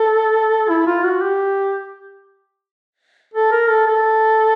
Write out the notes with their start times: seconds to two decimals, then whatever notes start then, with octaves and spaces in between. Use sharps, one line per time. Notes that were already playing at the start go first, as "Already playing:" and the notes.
Already playing: A4
0.69 E4
0.87 F4
1.05 F#4
1.22 G4
3.34 A4
3.52 A#4
3.69 A4
3.87 A4